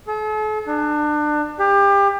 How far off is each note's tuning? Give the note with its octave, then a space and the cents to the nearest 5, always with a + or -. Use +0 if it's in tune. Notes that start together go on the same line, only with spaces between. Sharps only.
A4 -45
D4 +30
G4 +30